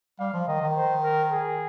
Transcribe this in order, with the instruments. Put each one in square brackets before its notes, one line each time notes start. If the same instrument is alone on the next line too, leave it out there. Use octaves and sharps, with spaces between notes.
[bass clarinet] G3 [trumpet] F5
[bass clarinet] F3
[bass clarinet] D#3 [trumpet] D#5
[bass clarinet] D#3
[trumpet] C5
A#4
G#4